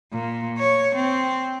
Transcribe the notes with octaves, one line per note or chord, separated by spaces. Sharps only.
A#2
C#5
C4